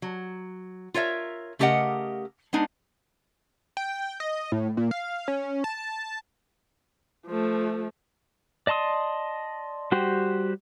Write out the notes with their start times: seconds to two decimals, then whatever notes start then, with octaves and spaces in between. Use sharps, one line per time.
0.02 F#3
0.94 F4 A#4 C#5 E5
1.59 C#3 A3 G4 A#4 D#5 F#5
2.53 G#3 B3 D4 D#4
3.77 G5
4.20 D#5
4.52 A2
4.77 A#2
4.91 F5
5.28 C#4
5.64 A5
7.26 F3 A3
8.67 D5 D#5 A5 C6 D#6
9.92 G3 F#4 G4 C5